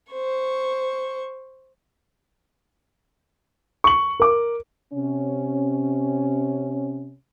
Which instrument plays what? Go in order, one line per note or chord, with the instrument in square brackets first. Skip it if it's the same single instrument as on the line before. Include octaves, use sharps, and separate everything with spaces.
[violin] C5 C#6
[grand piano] C#6 F#7
A#4 D6
[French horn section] C3 C#4